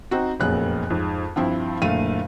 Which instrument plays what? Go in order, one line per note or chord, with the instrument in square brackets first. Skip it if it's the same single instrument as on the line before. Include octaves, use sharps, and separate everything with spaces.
[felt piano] C4 D#4 F#4
F1 F#2 A#2 B3 G#4 F#6
F2 G#2
G2 F3 C4 E4
F#1 A#2 D3 A3 F5 D#7